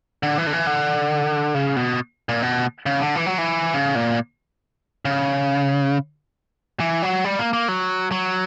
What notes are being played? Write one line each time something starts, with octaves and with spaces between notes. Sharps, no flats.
D3
E3
D3
E3
D3
C#3
B2
A#2
B2
C#3
D3
E3
F#3
E3
C#3
A#2
C#3
E3
F#3
G3
A#3
A#3
F#3
F#3